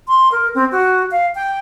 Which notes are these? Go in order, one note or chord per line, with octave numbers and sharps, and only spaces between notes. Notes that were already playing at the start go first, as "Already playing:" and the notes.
C6
A#4
C4
F#4
F5
G5